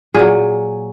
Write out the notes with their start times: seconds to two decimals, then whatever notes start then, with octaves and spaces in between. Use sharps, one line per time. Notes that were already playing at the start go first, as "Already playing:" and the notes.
0.14 A#2 F#3 G#4